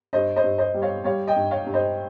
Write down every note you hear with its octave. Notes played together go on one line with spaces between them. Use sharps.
G2 C5 D#5
C5 D#5
G2
C5 D#5
G3
C#5 F5
G3 C#5 F5
D#5 G5
G2
C#5 F5
G2
C5 D#5